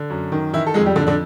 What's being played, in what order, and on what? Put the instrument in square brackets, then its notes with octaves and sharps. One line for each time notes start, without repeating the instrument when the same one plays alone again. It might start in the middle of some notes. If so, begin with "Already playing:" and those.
Already playing: [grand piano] D3
F#2
D#3
D#3 E3 E4
A4
F2 G#3 G#4
G3 G4
F2 D3 D4
D3 D4